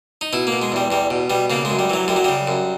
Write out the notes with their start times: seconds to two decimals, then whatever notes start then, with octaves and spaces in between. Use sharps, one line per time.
0.21 D#4
0.33 B2 E4
0.47 A#3
0.52 B2
0.62 G#3
0.72 E2 G3
0.90 E2 G3
1.10 B2
1.30 B2 G3
1.50 C#3 A#3
1.65 G#3
1.70 F#2
1.79 G3
1.90 E3 F#3
2.08 F#2 G3
2.16 F#3
2.24 C#3 G3
2.47 F#2